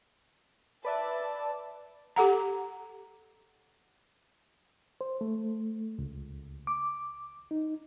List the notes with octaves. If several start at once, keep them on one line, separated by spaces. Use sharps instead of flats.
B4 D5 E5 A5
G4 A4 F#5 A#5
C5
A3
C#2
D6
D#4